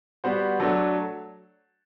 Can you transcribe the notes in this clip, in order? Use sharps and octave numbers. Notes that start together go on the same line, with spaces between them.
G3 B3 F#4 C5
F#3 A3 D4 A4